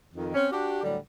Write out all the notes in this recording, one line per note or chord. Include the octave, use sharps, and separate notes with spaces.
F2 D#3
C4 C#4
D4 F#4 G4
A2 D3 F#3 G3